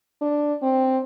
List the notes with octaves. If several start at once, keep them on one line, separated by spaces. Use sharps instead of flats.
D4
C4